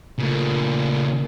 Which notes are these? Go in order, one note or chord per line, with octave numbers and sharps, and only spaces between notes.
A#2 C#3 A3